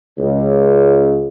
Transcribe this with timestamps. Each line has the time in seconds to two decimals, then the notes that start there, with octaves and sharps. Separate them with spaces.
0.17 C#2